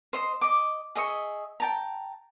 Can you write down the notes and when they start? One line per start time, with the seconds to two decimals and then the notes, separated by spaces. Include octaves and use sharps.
0.13 C5 D#5 C6
0.41 D#5 D6
0.95 G#4 D#5 E5 C#6
1.60 G5 A5 A#5